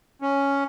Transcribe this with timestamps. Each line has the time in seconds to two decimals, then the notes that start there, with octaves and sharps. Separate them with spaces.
0.22 C#4